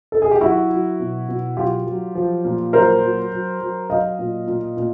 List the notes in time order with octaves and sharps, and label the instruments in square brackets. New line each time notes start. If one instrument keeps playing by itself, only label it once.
[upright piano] A4
G#4
G4
F#3 E4 F#4
F#3
B2
B2
F#3 F4 G4
F#3
F3
A#2
F#3 A#4 C5
F#3
F#3
F#3
F#3 D#5 F5
A#2
A#2
A#2